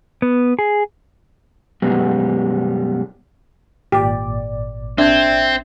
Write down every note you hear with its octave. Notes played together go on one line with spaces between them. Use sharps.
B3
G#4
F#2 B2 G3 G#3 B3
G#1 A#2 G4 D5
C4 D4 E5 G#6